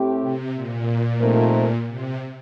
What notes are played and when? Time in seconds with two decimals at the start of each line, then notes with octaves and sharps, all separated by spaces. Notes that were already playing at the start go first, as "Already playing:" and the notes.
Already playing: A2 A3 C4 G4
0.21 C3
0.55 A#2
1.21 C3 F3 A3 D#4 A#4
1.87 C3